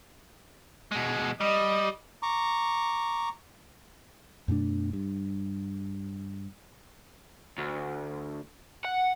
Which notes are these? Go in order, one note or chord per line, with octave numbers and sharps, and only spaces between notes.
B2 G#3
G3 D#5
A#5 C#6 D6
F#2 B2 A3 D4
G2
D2
F#5